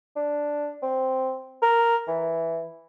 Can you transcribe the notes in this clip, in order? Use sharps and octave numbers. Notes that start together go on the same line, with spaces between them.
D4
C4
A#4
E3